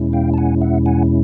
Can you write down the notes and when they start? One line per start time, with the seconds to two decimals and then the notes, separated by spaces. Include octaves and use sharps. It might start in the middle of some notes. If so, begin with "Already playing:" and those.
Already playing: E2 B2 G#3 C#4 E4
0.13 F5 G5
0.34 A5
0.38 F#5 G#5
0.62 E5 F#5
0.86 F#5 G#5